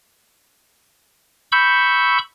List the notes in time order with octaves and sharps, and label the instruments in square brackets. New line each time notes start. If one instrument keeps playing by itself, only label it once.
[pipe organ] B5 C#6 E6 G6